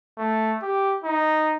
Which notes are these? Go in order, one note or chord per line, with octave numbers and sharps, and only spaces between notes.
A3
G4
D#4